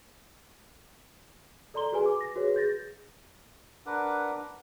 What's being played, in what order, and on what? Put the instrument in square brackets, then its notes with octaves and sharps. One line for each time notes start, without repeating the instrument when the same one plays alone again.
[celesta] A4 D5 A#5 C6 G7
F#4 G#4 B4 G#5
D6
A#6
F#4 G#4 B4 C#5
G#4 G6 A6 A#6
[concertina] D4 A#4 B4 F#5 D6